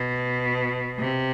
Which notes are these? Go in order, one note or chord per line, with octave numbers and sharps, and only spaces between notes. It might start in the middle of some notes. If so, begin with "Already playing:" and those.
Already playing: B2
C3